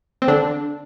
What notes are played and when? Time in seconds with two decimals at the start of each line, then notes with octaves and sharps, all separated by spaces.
0.22 C4
0.28 D3 D4